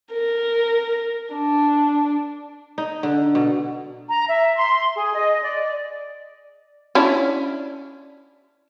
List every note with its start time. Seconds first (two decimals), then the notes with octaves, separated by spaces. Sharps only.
0.13 A#4
1.34 D4
2.78 D#4
3.03 D3
3.35 B2
4.09 A#5
4.27 E5
4.55 C6
4.96 G#4
5.15 D#5
5.42 D5
6.95 C#4 D4 E4